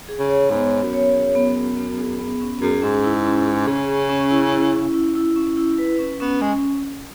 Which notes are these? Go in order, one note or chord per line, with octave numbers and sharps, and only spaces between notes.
G#4
C#3
C#5
G#2 B3
B3
F#2
C#5
G#4
B3
B3
B3
G#4
B3
C#4
F#2 G#4
G#2 C#4
E4
C#4
G#4
C#3 G#4
C#4
C#4
E4
E4
C#4
E4
E4
C#4
E4
B4
C#4
B3 C#4
G#3 C#4